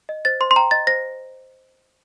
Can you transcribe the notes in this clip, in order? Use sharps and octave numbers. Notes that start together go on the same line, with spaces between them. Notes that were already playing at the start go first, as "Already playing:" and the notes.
D#5
C5 A6
C5 C6
C6
G5 A#5
D#5 A6
C5 A#6